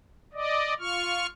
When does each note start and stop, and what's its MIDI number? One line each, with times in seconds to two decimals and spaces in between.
0.34 0.74 74
0.34 0.74 75
0.80 1.27 65
0.80 1.27 85
0.80 1.27 89